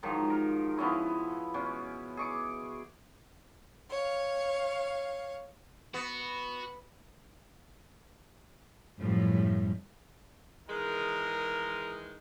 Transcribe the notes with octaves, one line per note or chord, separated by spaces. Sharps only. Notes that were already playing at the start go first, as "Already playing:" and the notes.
G#2 D#3 F3 F#3
A#4
F3 B3 C#4 E4
B2 C#4
G#4 C#6 D6
C#5 F5
B3 F#4
F#2 A2 F3 G3
D#3 E3 G#3 A#4